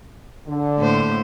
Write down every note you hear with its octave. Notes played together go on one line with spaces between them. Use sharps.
D3
A2 A#3 C5